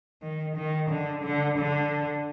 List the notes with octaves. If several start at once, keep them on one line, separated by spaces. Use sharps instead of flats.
D#3
D#3
D3
D3
D3